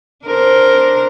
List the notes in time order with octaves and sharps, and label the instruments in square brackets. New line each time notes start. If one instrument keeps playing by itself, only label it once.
[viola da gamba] D4 A#4 C5